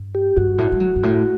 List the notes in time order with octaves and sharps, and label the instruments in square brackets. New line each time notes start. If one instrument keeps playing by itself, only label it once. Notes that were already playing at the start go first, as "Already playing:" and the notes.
Already playing: [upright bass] G2
[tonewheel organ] G4
[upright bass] G2 [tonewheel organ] F#4
[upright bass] A2
G3
F#3
G2
A2